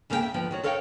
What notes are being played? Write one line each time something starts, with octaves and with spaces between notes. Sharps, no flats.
D#2 C#3 A3 A#3 G#4 G5
E5
D2 F3 B3 G5
D#3 F#4 C#5
A4 A#4 C#5 F5 G5